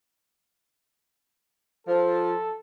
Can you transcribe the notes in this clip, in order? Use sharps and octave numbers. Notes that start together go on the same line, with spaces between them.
F3 A4